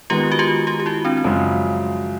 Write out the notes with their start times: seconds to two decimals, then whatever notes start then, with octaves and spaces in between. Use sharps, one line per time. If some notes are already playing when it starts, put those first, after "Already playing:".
0.10 D#3 G#3 B3 F4 G4
0.32 F#4
0.39 F4 G4
0.67 F4 G4
0.80 G4
0.86 E4 F#4
1.05 C4 D4
1.17 D4
1.24 F#2 C#3 F3 G#3 C#4